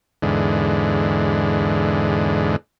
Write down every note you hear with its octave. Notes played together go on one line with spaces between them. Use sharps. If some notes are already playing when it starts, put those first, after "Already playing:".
E2 G#2 D3